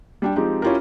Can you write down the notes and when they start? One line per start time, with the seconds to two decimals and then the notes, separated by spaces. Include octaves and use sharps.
0.22 G3 D4 G5
0.36 F3 G#3 C4 D#4 G4
0.62 C#4 E4 F4 G4 A#4